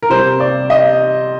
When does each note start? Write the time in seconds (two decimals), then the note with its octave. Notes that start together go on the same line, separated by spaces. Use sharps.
0.03 A#4
0.10 C3 G3 C4 C5
0.40 D5
0.70 D#5